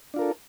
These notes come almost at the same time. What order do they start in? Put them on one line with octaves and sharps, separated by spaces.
D4 F4 A#4 A4